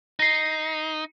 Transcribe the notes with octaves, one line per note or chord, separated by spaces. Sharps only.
D#4 A#6 C7